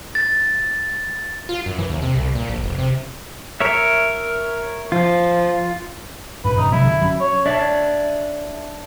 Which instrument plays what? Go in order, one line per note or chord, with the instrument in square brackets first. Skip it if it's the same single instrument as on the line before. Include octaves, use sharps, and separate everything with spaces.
[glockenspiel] A6
[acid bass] F4
F#2
E3
D#2
C3
C2
A#2
A#1
F1
C3
[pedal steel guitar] A#4 C#5 E5
[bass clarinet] F3 [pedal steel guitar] F4
[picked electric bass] B1 F#2 A2 [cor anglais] B4
[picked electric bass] A#1 G2 C#3 [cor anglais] D#4
[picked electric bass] C3 F#3 G#3 [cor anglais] E4
[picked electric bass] A#1 F#2 D3
F#3 C#4
[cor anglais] C#5
[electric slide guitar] D4 C#5 D5 E5